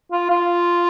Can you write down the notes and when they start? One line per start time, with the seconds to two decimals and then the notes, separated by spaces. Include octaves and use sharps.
0.12 F4
0.30 F4